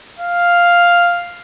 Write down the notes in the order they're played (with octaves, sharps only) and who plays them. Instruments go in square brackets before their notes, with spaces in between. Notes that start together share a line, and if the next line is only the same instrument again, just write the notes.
[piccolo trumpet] F5